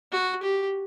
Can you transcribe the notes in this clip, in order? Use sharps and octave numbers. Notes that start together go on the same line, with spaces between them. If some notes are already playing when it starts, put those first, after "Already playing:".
F#4
G4